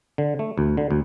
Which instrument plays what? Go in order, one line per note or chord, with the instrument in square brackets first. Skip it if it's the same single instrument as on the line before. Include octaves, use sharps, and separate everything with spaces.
[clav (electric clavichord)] D3
A3
D2
D3
D2